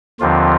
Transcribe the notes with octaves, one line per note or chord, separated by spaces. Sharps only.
D#2 D3 F3 C4 F4